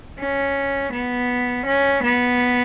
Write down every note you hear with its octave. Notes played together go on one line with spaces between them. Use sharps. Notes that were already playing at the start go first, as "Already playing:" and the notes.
C#4
B3
C#4
B3